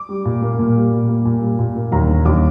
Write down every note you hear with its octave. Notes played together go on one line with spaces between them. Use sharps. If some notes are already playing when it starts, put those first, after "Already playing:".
Already playing: D6
G3
A#2
A#3
A#2
G3
A#2
A#3
A#2
G3
A#2
A#3
D#2 A#5
D3
D#2 D6